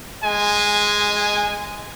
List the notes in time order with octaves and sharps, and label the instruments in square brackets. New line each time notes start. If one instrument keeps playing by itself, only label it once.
[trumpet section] G#3 G#5